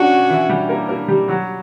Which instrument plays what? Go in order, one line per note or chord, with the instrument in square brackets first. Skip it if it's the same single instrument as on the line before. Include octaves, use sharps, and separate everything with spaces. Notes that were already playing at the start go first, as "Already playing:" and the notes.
Already playing: [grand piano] C#4 D4 [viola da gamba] F#4
[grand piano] E3 E4
G3 G4
A#3 A#4
A#3 A#4
G3 G4
F#3 F#4